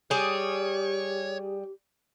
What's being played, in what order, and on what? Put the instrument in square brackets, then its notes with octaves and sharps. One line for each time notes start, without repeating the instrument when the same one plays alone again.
[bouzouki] G3 G#4 [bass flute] G4 [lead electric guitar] C#5